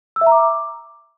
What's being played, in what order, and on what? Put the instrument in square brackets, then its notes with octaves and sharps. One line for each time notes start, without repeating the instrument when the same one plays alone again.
[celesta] E6
E5
A#5
D6